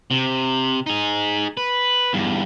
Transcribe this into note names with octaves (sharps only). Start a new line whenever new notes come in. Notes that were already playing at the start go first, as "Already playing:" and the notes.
C3
D#4 G#4
B4
E2 G2